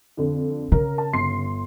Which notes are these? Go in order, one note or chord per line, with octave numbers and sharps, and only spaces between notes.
F2 D3
C#3 A#4
A5
G1 C6 C7